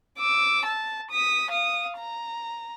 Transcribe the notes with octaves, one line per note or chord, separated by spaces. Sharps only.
D6 E6
A5
D#6 B6
F5 D#6
A#5